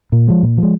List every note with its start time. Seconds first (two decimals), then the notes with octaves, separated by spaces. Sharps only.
0.12 A#2
0.28 F3 G#3
0.43 A#2
0.58 F3
0.63 G#3